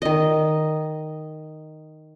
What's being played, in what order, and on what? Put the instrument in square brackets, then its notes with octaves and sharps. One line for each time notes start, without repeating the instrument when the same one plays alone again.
[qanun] D#3 D#5